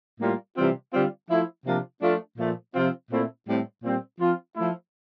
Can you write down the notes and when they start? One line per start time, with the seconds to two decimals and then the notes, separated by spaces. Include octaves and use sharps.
0.19 A2 G3 A#3 F4
0.55 C3 E3 G3 C4 F4
0.92 D3 G3 C4 F4
1.28 F3 A3 E4
1.65 C3 F3 A#3 D4 F4
2.01 F3 A3 D4 F4
2.37 A#2 F3 A3
2.74 C3 F3 C4 F4
3.10 A#2 A3 C4 E4
3.47 A2 G3 C4
3.83 A#2 G3 C4
4.19 F3 C4 F4
4.55 F3 A3 E4